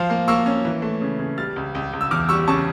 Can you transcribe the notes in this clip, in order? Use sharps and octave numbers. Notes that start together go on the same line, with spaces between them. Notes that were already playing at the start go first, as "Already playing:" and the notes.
Already playing: F3 F5
A#3
A#3 C#6 E6
C#4
E3
A3
C#3
C#3
G3 F6 A6
C#2
C#2
C#2
E6
E2 D6 F6
G3 C#6 E6
C#3 A5 C#6